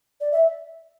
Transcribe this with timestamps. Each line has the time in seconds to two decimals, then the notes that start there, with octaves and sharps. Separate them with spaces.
0.21 D5
0.32 E5